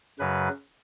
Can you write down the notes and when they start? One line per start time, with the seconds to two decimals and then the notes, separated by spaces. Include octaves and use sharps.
0.19 F#2 C#3 F#3 B4